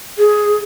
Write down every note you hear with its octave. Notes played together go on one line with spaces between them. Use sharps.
G#4